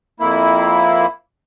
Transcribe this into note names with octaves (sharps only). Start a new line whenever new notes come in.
F2 A#3 E4